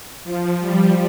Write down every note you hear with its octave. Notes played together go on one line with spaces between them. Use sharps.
F3
G3